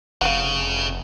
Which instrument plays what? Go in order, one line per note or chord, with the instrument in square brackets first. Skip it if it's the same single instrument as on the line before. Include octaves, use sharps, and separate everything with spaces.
[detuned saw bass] F1 [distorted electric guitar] C#3 [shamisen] F5 F#5